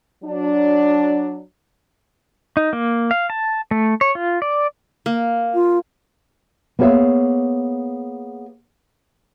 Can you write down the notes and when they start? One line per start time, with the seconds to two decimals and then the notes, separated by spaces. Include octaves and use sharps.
0.24 F#3 D4
2.57 D#4
2.73 A#3
3.11 F5
3.30 A5
3.71 A3
4.01 C#5
4.15 F4
4.42 D5
5.06 A#3
5.54 F4
6.79 A#3 B3 G#4 C#5 E5 F5